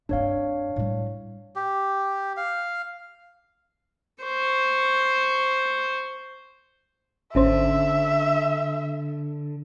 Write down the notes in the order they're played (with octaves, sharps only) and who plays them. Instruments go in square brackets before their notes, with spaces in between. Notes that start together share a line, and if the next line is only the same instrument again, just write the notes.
[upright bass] G2 C4 [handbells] D4 C#5 F5
[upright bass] A2 G3
[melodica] G4
F5
[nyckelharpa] C5 C#6
[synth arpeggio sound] G#1 C#4 C5 [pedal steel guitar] D3 [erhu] E5